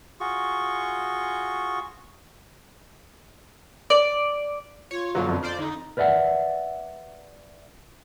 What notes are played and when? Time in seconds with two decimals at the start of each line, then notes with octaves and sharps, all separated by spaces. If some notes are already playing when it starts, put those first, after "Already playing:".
0.20 F4 F#4 G#4 C#6
3.90 D5
4.91 F4 C#5
5.15 F#2 B2 D3 F#3 A#3
5.29 F2
5.43 F4 C5 D5
5.58 D3 D#4
5.97 A#4 B4 D5 E5 F#5